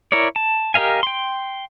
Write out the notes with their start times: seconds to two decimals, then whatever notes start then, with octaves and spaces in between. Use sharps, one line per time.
0.12 E4 A#4 C#5 D5
0.36 A5
0.74 G4 A#4 D#5 F5 G#5
1.03 G5 C6